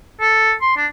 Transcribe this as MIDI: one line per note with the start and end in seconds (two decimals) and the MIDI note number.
0.20 0.53 69
0.61 0.74 84
0.77 0.86 62